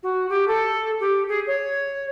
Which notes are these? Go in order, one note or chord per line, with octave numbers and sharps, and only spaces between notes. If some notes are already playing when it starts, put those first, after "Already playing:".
F#4
G4
A4
G4
G#4
C#5